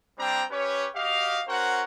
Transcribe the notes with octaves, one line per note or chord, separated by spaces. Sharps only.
G3 C4 D4 C5 G5 A#5
C#4 G4 B4 C#5
F#4 G4 D#5 F5
C#4 F#4 A#4 C5 F#5